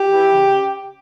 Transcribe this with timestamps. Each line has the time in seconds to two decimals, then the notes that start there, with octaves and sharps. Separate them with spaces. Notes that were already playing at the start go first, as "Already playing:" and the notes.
Already playing: G4
0.10 E3
0.31 C#3